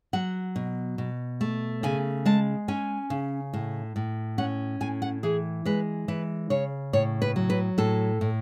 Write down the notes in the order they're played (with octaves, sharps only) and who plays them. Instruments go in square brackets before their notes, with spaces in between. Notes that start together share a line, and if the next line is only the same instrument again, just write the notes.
[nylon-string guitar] F#3 F#5
B2
B2
A3
C#3 G#5
G#3 A5
C#4 G#5
C#3
A2
A2
C#4 F#5
A2 G#5
F#5
E3 G#4
G#3 B4
E3 B4
C#3 C#5
A2 C#5
B4
F#3
B4
A2 A4
A2